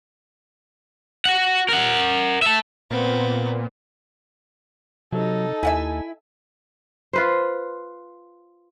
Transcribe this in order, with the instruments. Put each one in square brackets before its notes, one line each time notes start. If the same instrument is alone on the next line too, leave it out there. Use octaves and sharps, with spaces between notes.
[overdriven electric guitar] F#4 F#5
A#4 F#5
E5 A5
[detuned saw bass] A#2 [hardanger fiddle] B3 C4
[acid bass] C3 [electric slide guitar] F#3 [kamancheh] D#4 A4
[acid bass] D#2 [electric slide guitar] E4 [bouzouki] E5 F#5 G#5
[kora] F4 B4 C5